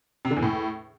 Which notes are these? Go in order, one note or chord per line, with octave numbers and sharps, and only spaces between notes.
C3
D3
E2
A2